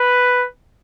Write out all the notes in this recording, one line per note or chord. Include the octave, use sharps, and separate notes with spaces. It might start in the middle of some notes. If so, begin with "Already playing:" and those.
Already playing: B4